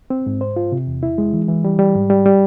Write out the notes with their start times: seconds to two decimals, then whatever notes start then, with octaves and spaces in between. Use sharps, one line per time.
0.10 C4
0.26 G#2
0.41 C5
0.56 F4
0.72 C3
0.87 E2
1.03 E4
1.18 G#3
1.33 E3
1.49 E3
1.64 G3
1.79 G3
1.95 G#2
2.10 G3
2.25 G3